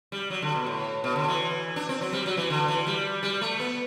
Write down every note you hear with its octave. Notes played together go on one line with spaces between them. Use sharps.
G3
F#3
D3
B2
A2
B2
D3
E3
D4
C4
F#3
G3
F#3
E3
D3
E3
G3
G3
A3
B3